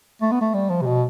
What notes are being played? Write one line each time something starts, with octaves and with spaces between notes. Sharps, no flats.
A3
B3
A3
G3
F3
C3
B2